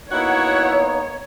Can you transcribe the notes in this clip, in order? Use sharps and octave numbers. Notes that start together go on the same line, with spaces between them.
A#3 B3 D#4 E4 F#4 C#5 F#5